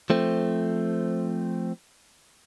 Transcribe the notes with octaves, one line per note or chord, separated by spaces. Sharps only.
F3 A3 C4